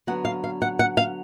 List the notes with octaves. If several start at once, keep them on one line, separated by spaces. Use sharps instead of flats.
D3 F#3 B3 F#5
F5
F5
F#5
F#5
F5